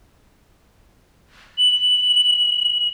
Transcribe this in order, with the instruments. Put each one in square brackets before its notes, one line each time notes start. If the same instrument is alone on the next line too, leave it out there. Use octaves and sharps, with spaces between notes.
[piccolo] F#7